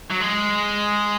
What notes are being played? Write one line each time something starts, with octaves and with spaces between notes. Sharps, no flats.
F#3
G#3